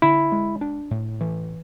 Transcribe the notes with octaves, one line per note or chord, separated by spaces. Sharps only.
D3 E4
G#3
D4
A2
E3